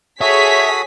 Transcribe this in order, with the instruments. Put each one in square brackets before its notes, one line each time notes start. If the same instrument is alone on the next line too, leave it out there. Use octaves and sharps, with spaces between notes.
[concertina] F#4 A4 D#6 [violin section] G#4 B6 [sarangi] C#5 [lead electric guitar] E5